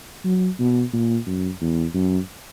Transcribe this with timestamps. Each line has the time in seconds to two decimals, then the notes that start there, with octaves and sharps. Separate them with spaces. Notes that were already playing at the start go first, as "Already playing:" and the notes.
0.24 F#3
0.59 B2
0.93 A#2
1.26 F#2
1.61 E2
1.94 F#2